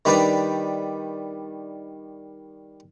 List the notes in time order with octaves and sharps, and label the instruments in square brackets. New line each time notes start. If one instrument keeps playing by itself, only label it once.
[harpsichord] D#3 G3 D4 D#4 B4 D5